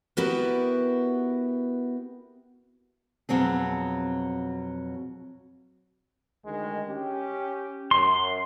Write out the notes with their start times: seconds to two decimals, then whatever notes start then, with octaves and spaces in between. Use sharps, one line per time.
0.17 B3 E4 F#4 G4 A#4 B4
3.29 F2 B2 F#3 C4 G#4
6.45 D2 D#3 G#3
6.88 C#4 G4
7.91 F#2 C6